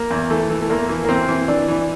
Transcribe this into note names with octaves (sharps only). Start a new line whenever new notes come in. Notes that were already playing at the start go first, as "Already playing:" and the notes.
Already playing: A#3
E2
E3 A3
E3
A3
E2 A#3
E3
A#3
E3 C4
E3
E3 D4
E3